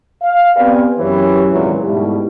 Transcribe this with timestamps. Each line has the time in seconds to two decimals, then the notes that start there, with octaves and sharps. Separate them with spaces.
0.22 F5
0.55 B3 C4 G4 B4 D5 G#5
0.99 F#2 E3 G4 B4 C#5
1.50 G#1 C#2 A#2 E3 F#3 G#3
1.83 G#2 B2 G3 A3 E4 G4